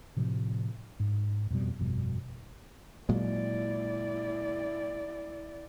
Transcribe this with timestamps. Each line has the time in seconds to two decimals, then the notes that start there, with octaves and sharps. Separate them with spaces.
0.17 A2 C3 F3
1.00 G#2
1.50 F2 B2 G3
1.79 G1 F2 B2 G3
3.09 A#2 F#3 G#3 E4 D5